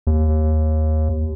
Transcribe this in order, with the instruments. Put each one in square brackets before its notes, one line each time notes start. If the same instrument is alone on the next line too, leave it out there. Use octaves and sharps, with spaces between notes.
[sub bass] D#2